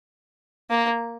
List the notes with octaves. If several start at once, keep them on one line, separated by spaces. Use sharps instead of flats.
A#3